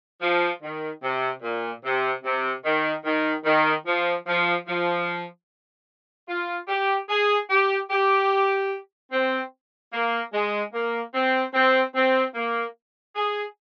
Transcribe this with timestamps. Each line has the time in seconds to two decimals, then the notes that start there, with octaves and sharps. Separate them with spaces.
0.22 F3
0.62 D#3
1.03 C3
1.43 A#2
1.84 C3
2.25 C3
2.65 D#3
3.05 D#3
3.45 D#3
3.86 F3
4.27 F3
4.67 F3
6.29 F4
6.69 G4
7.10 G#4
7.50 G4
7.91 G4
9.12 C4
9.93 A#3
10.33 G#3
10.73 A#3
11.15 C4
11.54 C4
11.96 C4
12.35 A#3
13.16 G#4